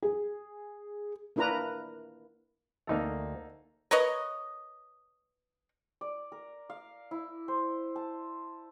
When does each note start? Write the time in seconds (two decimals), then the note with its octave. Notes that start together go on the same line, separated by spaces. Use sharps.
0.02 G#4
1.36 A#3 D4 E4 A#4 B4 A#5
2.87 D2 A#3 D#4 A4 A#5
3.91 A#4 B4 C#5 D#5
6.01 D5
6.32 A#4
6.70 F5
7.11 E4
7.48 C5
7.96 A5